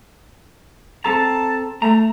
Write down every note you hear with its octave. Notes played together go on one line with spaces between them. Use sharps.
C4 A4 A5 A#5
A3 A#5